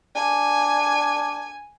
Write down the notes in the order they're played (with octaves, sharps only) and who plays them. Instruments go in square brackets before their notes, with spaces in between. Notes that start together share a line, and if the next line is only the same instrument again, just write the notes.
[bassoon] D4 [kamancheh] G#5